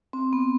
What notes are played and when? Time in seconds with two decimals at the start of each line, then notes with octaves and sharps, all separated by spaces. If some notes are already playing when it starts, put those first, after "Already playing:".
0.13 C4
0.33 B3